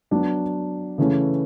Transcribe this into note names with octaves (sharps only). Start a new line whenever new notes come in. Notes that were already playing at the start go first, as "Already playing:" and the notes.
F#3 B3 D4 F#4
C#3 E3 A3 C#4